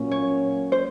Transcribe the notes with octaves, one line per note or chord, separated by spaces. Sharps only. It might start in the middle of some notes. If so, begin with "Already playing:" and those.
Already playing: A#2 F#3 A#3 C#4
C#5
C5